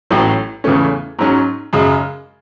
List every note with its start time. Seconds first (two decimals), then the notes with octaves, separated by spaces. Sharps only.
0.11 A1 A2 F#3
0.64 E2 C#3 E3 A3 C#4
1.19 G#2 F#3 C#4
1.73 F#2 C#3 G#3